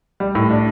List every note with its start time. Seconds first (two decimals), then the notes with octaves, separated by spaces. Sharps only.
0.20 G3
0.35 A2
0.51 D4